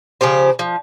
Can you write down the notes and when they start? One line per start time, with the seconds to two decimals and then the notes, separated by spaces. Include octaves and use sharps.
0.21 C#3 F3 G4 C5
0.59 F3